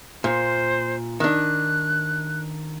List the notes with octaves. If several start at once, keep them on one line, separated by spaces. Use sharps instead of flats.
A#2 C5
D#3 D4 F#6